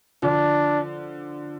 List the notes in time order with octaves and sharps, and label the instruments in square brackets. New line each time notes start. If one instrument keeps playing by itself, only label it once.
[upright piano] D3 F3 [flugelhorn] D4